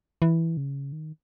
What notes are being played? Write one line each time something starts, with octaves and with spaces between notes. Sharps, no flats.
E3
C#3
D#3